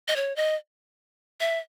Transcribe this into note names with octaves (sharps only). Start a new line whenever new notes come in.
D#5
C#5
D#5
E5